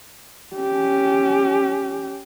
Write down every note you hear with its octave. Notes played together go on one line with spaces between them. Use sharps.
C#4 G4